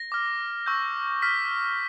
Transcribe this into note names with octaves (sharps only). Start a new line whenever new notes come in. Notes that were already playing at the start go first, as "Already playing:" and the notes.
Already playing: A#6
D6 F6
C#6 E6 G6
D6 F6 B6